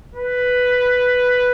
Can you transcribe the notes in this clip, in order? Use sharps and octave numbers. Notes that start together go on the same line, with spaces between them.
B4